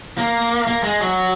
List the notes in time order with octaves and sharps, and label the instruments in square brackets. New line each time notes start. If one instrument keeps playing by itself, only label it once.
[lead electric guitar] A#3
A#3
G#3
F#3